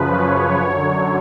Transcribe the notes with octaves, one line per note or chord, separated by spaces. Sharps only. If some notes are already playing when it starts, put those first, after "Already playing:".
Already playing: F#2 C#3 F3 B4
C#5
F#2 D3 F#3